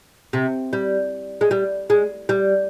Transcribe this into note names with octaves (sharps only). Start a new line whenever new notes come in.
C3
G3
G#3
G3
G#3
G3